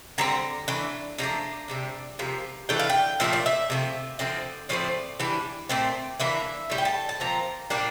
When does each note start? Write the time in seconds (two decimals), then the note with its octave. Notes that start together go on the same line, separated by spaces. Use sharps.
0.18 D3 G3 C4 A#5
0.68 E3 A3 D4
1.18 C3 F3 A3 D4 A#5
1.68 C3 G3 D4
2.19 C3 F3 A#3
2.69 E3 A3 D4 G5
2.79 F5
2.90 G5
3.20 A#2 F3 A3 D4 E5
3.33 D5
3.46 E5
3.70 C3 F3 A3
4.19 D3 F3 C4 D5
4.69 A2 F3 A3 C4 D5
5.20 E3 G3 D4
5.69 A#2 A3 C4
6.19 E3 A#3 D4 E5
6.70 A2 G3
6.78 G5
6.85 A5
7.09 A5
7.20 A#2 F3 C4 A#5
7.70 A#2 G3 A#3 D4